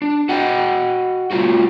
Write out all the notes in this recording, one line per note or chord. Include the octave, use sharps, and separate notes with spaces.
D4
F#4 D#5 F#5 G5
C3 E3 A3 F4 F#4